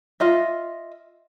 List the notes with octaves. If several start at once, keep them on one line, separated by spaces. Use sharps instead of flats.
F4 D#5 E5